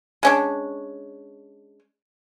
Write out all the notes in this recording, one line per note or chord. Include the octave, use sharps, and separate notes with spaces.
G#3 C#4 D4